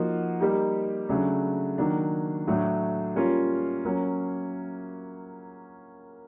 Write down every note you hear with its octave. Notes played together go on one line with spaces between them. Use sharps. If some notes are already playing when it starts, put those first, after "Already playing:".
Already playing: F3 A#3 D#4 F#4
G3 A#3 D#4 G4
C#3 F#3 A3 D4
D#3 F#3 A#3 D4
A2 F#3 A3 D4
G3 A#3 C#4 F4
F#3 A#3 C#4